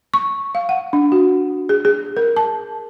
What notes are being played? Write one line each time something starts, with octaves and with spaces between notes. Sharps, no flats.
C#6
F5
F#5
D4
F#4
G#4
G#4
A#4
A5